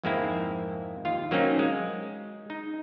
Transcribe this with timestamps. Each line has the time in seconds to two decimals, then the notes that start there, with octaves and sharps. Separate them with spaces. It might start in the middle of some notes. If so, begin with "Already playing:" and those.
0.04 F2 G#2 G#3 A#3 C4 E4
1.05 D#2 F4 F5
1.31 F#3 A#3 C4 C#4 D#4
1.59 G#3
2.50 D#4